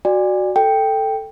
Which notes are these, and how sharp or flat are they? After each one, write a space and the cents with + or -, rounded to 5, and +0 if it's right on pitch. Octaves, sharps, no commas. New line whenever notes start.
F#4 +0 D5 +15 G#5 -35
A4 +5 G5 +5